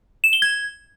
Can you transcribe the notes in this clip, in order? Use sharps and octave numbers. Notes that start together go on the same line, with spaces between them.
E7
G7
G#6